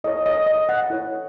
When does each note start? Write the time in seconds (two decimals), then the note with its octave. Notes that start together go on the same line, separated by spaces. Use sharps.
0.04 E4 A4 C#5 D#5
0.26 D#5
0.46 D#5
0.69 F#5
0.90 E4 A4 C#5